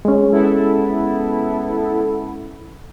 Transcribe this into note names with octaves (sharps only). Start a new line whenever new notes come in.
G#3 C#4
B3 E4 A4